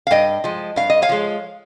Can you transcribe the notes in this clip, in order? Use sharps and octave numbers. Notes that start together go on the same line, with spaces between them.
F5
G2 D#5 G5
F3 G#3
G2 F5
D#5
C#5 F5
F3 G#3